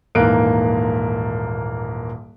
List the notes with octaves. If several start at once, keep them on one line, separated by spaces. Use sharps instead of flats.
D#1 G#2 E3 A#3 F#6 D7